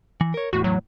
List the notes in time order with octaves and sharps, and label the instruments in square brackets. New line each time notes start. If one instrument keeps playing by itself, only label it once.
[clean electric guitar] E3
A#4 C#5
[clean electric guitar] E2 A2 [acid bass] F#4
[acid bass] F#3